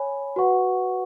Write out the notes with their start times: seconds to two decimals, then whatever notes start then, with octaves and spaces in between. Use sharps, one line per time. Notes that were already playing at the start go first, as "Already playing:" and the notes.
Already playing: C#5 G#5 B5
0.36 F#4 B4 F#5 C#6